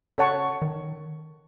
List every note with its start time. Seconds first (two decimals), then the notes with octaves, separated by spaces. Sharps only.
0.18 C#3 A4 C#5 F#5 A5 C#6
0.62 D#3